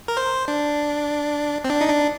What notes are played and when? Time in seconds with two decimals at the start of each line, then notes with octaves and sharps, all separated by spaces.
0.08 A#4
0.17 C5
0.48 D4
1.64 C4
1.70 D4
1.81 D#4
1.89 D4